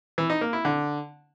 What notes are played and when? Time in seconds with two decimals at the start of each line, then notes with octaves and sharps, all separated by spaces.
0.18 E3
0.30 D#4
0.41 A#3
0.53 E4
0.65 D3